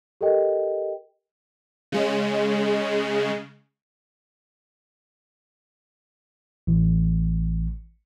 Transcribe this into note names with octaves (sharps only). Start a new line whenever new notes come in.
G4 A4 A#4 D#5 G5
C#3 G#3
A1